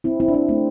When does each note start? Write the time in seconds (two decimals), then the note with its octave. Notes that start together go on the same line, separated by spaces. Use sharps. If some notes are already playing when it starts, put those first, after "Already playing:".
0.04 C4 E4
0.20 C4 E4
0.28 D4
0.34 C4 E4
0.49 A3 C4